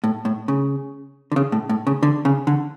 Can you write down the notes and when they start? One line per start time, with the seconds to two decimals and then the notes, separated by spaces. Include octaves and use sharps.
0.04 A2
0.25 A2
0.48 C#3
1.32 D3
1.36 C#3
1.52 A2
1.69 A2
1.87 C#3
2.03 D3
2.25 C#3
2.47 D3